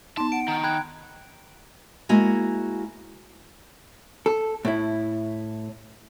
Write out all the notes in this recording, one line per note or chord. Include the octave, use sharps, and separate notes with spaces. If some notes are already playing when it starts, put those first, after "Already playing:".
B3 D#4 A5 C6
F#5 D7
D#3 A#5
G5 B5 F#6 G#6
G#3 A#3 E4 F#4 G#5 A#5
A4
A2 E4